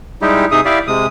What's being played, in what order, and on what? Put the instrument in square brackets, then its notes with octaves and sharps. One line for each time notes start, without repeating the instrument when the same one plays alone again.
[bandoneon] G3 G#3 D#4 E4 G4
C3 D#4 G#4 E5 D#6
E4 G4 D5 E5 F5
C3 G#3 D#6